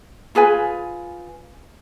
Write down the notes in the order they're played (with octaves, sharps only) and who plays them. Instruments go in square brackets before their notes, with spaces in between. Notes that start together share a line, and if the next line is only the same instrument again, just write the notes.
[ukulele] F4 G#4 B4 G#5